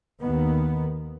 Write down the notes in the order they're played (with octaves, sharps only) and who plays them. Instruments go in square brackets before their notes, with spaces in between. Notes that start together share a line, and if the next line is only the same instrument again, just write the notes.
[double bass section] D#2 D#3 B3